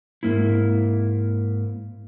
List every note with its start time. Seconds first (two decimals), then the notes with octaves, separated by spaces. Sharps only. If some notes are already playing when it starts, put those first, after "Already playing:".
0.23 G#2 C3 A#3 C4 E4